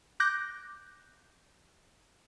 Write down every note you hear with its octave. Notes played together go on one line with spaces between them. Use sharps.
D6 F#6 G6 A#6